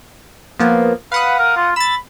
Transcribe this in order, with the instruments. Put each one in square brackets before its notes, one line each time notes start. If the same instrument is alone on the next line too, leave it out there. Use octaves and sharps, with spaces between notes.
[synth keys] F3 A#3 B3
[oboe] B4 [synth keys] F5 F#5 D#6
[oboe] A#4
F4
[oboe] B5 [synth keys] E6 A6